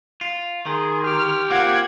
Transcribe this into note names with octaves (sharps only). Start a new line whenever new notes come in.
F4
D#3 G#4 C6
G4 F6
A#3 C4 F4 F#5 G#6